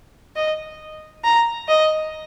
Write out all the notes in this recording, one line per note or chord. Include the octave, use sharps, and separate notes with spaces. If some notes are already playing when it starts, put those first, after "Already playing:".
D#5
A#5
D#5